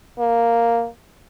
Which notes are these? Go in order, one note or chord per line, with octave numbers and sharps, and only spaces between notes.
A#3